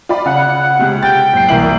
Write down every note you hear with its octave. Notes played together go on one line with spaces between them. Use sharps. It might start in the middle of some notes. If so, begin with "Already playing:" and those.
F4 D5 B5
C#3 F5 F#5
C#2 C3
G5 A6
F#1 C7
C2 E3 A#3 E4 F#7